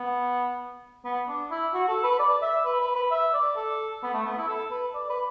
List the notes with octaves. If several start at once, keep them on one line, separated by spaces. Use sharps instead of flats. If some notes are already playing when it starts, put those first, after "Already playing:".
Already playing: B3
B3
D4
E4
F#4
A4
B4
D5
E5
B4
B4
B4
E5
D5
A4
B3
A3
B3
E4
A4
B4
D5
B4